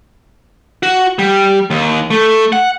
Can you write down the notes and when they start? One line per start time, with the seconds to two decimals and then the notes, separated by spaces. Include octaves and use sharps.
0.83 F#4
1.19 G3
1.70 D#2
2.11 A3
2.53 F#5